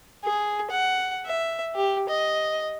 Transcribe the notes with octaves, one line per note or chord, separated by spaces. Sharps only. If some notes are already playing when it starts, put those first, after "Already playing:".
G#4
F#5
E5
G4
D#5